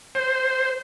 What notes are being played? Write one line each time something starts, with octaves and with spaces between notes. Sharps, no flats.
C5